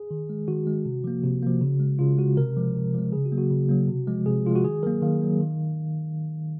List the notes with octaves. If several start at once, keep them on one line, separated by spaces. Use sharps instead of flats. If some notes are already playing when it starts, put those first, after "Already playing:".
Already playing: G#4
D#3
G#3
D#3 F#4
G#3
C3
F3 A#3
C3
F3 A#3
C#3
G#3
C#3 F4
G#3 F#4
C3 A#4
F3 G#3
C3
F3 G#3
C#3 G#4
F#4
F#3 A#3
F#4
C#3
F#3 A#3
C3
F3 G#3
C3 G#4
F3 G#3 F4
F#4
D#3 G#4
F#3 A#3 A#4
D#3 F5
F#3 A#3
D#3